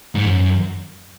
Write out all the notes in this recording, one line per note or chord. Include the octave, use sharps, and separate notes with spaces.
G#2
F#2